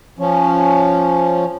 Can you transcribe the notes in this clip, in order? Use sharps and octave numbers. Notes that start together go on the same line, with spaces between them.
F3 C#4